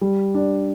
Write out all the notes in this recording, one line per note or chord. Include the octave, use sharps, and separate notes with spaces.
G3
D4